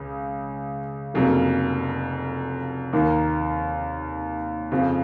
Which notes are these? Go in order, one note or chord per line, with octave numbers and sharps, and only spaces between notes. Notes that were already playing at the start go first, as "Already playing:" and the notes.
Already playing: C#2 C#3
F1 F2 C#3 F#3 A#3
D#2 D#3 A#3
F2 C#3 F3